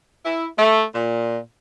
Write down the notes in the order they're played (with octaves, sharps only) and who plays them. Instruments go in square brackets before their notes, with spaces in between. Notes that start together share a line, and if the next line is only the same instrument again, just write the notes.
[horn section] E4
A3
A#2